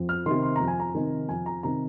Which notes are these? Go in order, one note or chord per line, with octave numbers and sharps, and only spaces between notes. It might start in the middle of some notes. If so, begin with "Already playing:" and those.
Already playing: F2
F6
C3 D#3 C6
C6
F2 A#5
G#5
A#5
C3 D#3
F2 G#5
A#5
C3 D#3 A#5